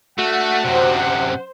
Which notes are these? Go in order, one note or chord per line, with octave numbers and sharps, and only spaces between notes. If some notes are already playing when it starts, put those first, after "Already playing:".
A3 D4 F#4 F#5
F#2 C3 C5